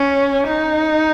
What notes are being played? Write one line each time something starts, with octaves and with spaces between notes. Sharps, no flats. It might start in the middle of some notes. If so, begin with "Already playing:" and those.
Already playing: C#4
D#4